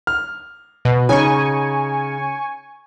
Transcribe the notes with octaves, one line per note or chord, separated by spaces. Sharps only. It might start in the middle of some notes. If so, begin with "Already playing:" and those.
F6
B2
C#3 D#4 C#5 G#5 C#6